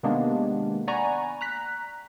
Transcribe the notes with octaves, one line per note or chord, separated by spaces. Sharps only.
C3 D#3 G#3 A#3 B3 D4
D5 F#5 G#5 A#5 B5 C#6
A#5 F#6 B6